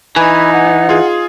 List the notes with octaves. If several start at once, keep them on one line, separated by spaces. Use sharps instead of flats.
E3 D#4 B4 G#5 B5
F#5
F4 G#4